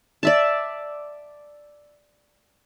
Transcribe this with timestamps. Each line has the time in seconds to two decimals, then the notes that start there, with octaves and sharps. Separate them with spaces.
0.23 D5 E5 A5